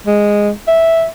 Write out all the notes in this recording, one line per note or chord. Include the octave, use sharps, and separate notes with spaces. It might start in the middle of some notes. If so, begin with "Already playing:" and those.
G#3
E5